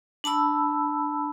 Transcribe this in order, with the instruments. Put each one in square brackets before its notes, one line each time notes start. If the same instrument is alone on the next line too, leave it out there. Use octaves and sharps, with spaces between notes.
[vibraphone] D4 A5 B5 E6